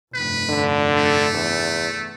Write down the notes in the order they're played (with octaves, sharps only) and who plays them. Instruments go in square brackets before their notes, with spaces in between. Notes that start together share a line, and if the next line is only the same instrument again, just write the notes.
[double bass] F1 G2 [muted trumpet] B4
[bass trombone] D3
[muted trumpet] A3
[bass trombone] E2